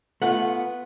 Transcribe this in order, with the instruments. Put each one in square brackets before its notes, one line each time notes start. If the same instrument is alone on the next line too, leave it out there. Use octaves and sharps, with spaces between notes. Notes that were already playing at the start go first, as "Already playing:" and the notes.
[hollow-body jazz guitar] A3 B3 F4 [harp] F#5